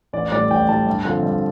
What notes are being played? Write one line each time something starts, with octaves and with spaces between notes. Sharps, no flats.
A1 D5
A2 G3 D5
A1 G5
A2 G3 A5
G2
D3 F3 C4
G2